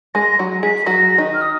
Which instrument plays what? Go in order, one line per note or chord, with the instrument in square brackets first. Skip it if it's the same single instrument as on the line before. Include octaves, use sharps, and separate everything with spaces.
[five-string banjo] G#3 G#4 [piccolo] A#6
[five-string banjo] F#3 F#4
[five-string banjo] G#3 G#4 [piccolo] B6
[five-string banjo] F#3 F#4 [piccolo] A#6
[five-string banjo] D#3 D#4
[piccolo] F6
D#6